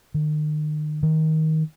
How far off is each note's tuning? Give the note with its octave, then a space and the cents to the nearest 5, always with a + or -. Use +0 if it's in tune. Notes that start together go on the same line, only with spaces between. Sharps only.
D#3 -40
D#3 +20